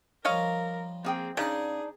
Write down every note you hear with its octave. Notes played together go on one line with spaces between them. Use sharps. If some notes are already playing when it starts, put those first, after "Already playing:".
F3 G3 D4 A#4 C#5 D#5 F5
A#3 C4 G#4 G5
C#3 D4 D#4 G#4 D5 G#5 C#6